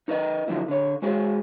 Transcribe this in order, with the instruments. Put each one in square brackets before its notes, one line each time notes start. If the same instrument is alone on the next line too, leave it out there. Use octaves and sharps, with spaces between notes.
[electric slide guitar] D#4 A#4 B4 D#5
D3 F3 F#3 A3 B3 E4
D3 C#5
G#3 F#4 G#4 C5 C#5